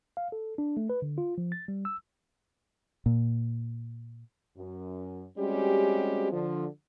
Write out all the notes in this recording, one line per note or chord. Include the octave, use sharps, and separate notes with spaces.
F5
A4
D4
A3
B4
D3
F4
F3
A6
G3
E6
A#2
F#2
G3 G#3 C4 C#4 F#4 G4
D3 F3